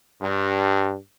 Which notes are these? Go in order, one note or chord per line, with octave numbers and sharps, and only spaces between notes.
G2